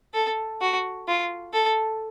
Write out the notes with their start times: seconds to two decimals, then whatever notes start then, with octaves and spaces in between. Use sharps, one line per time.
0.14 A4
0.61 F#4
1.07 F4
1.53 A4